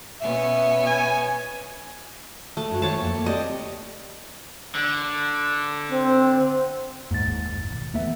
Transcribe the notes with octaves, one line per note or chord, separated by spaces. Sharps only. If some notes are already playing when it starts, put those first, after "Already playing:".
B2 B3 C#4 E5
G#5
A3
G2 G#3 F#4
D#3 C5 C#5 A5
F2 A#3 F4
A#3
C4 G4 D5 D#5
D3
C4
D#2 G#2 A6
G#2
F#1
B2 D#3
D#2 E3 A3 B3 E5